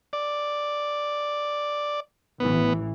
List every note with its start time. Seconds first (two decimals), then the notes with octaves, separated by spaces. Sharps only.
0.13 D5
2.40 A1 E3 B3